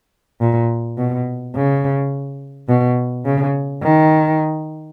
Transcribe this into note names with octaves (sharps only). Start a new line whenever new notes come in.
A#2
B2
C#3
B2
C#3
D#3